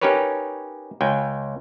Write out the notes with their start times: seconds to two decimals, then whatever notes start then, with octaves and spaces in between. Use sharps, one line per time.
0.01 C#4 D#4 G4 A#4 B4 C#5
1.01 C#2 G5 G#5